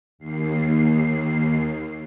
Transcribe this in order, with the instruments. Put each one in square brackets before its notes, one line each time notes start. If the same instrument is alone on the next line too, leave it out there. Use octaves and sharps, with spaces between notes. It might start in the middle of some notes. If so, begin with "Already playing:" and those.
[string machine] D#2 C7